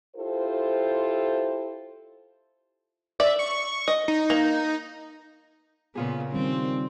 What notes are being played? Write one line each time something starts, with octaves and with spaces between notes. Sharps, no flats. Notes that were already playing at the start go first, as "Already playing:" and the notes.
E4 F4 G4 A4 C5
D5 E5
C#6
D#5
D#4
A#3
A#2 C#3 B3 F4 G#4
D#3 G3 C4 C#4